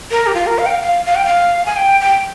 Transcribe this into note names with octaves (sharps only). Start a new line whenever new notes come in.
A#4
G4
F4
A#4
F5
G5
F5
F5
F5
G5
F5
G#5
G5
G5